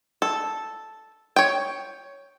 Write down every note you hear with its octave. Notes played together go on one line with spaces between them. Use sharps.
A4
C#5 G5